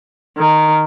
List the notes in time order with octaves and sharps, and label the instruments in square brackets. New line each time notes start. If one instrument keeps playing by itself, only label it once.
[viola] D#3